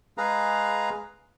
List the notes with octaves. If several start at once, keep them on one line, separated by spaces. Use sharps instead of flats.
G#3 G#4 B4 F5 A#5